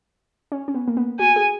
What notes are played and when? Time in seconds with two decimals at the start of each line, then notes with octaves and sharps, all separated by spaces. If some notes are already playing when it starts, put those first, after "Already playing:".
0.52 C#4
0.68 C#4
0.75 B3
0.88 A#3
0.97 B3
1.19 F#4 G#5
1.36 G#4